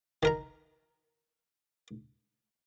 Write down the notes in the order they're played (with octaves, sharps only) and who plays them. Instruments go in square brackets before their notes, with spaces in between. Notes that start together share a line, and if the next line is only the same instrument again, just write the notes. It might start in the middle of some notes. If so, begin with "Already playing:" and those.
[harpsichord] D#3 A#4 A#5